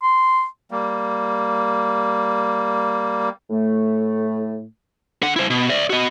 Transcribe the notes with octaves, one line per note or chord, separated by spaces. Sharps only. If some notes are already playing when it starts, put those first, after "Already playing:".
C6
G3 A#3
A2 A3
D3 F#5
E4 C5
B2
D5 E5
F#4 D#5